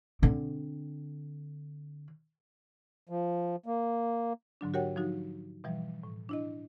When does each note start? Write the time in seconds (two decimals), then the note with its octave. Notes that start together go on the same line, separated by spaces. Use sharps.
0.22 D3 C4
3.09 F3
3.66 A#3
4.61 G#2 D3 F#3 D4
4.74 F#4 G4 A#4 C#5 F#5 G5
4.96 F3 F#3 D#4 F#4
5.64 B2 E3 F3 G3
6.03 A2
6.29 D4 E4 D#5